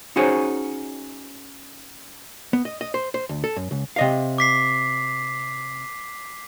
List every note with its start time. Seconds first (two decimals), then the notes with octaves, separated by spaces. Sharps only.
0.16 C#4 D#4 F#4 G#4 C5 C#5
2.53 B3
2.65 D#5
2.81 D#5
2.94 C5
3.14 C5
3.29 D2
3.44 A4
3.56 F#2
3.71 C#2
3.96 C3 D#5 F5
4.38 D6 B6 C7